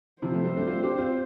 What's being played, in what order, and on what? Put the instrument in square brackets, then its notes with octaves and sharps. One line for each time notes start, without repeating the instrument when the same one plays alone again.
[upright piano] C3 F3 [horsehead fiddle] C5
[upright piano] F3 A3
G3 C4
A3 D4
C4 F4
D4 G4
C4 F4